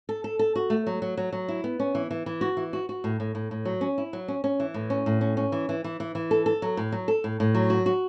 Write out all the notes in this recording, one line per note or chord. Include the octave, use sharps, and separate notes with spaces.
A4
A4
A4
F#4
A3
F#3
F#3
F#3
F#3
E4
B3
C#4
E3
E3
E3
F#4
E3
F#4
F#4
A2
A2
A2
A2
F#3
C#4
E4
F#3
C#4
C#4
E3
A2
C#4
A2
C#4
C#4
E3
E3
E3
E3
E3
A4
A4
F#3
A2
F#3
A4
A2
A2
F#3
F#4
F#4